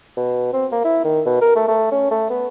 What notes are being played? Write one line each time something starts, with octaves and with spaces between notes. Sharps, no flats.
B2
C4
A#3
E4
D#3
B2
A#4
A3
A3
C#4
A3
B3